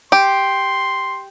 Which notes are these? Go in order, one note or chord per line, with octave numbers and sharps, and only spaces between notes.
G4 C6